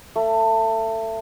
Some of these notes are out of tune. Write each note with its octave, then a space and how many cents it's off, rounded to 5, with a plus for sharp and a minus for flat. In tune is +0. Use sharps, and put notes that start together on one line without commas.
A3 +25